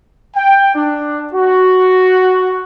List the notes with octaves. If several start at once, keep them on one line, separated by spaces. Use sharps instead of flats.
G5
D4
F#4